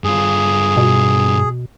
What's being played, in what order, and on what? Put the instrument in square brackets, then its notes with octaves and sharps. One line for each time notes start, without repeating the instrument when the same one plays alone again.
[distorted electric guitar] G2 F4 [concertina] G#4
[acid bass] B2